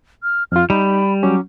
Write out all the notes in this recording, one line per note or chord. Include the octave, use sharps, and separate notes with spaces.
F6
F2 F4 F6
G3 D#4 B5
F#3 C#4 D6